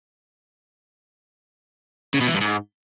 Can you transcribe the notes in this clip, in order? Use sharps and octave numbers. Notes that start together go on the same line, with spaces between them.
C#3
B2
E3
G2
G#2